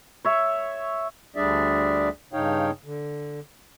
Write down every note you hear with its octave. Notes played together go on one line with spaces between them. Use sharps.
C#5 E5
D2 G3 D4 G#4 D5 E5
G2 C#3 D#4 C#5 F5 G5
D3